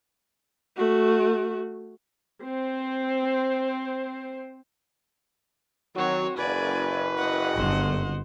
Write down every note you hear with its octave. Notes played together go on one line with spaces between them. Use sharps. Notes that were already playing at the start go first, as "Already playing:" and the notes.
A3 F#4
C4 C5
D#3 F#3 C4 F#4 C#5
F#1 B4 D5 G#5
D#5 F#5
G1 C5